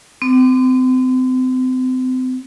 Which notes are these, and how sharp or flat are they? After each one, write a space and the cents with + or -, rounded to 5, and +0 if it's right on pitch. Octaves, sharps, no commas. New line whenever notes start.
C4 -35